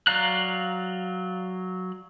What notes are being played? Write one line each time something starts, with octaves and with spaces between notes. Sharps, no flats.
F#3 D5 F5 A#5 F#6